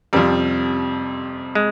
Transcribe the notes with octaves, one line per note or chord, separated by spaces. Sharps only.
F2 C3 F3 G3
G#3